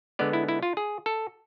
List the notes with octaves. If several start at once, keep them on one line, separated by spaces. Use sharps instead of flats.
D3 G#3 B3 D5
E4
E4
F4
G#4
A4